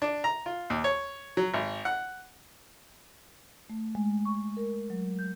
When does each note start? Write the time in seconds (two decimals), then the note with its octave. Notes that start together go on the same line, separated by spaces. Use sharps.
0.02 D4
0.24 A#5
0.46 F4
0.70 D#2
0.84 C#5
1.37 F#3
1.53 G#1
1.85 F#5
3.70 A3
3.95 G#3
4.25 C#6
4.57 A#4
4.90 F#3
5.19 G6